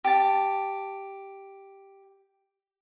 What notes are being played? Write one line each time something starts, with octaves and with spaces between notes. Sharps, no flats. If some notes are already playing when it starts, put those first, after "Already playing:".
G4 A5